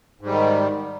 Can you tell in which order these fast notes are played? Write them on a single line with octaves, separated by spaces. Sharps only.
G#2 G3 D#3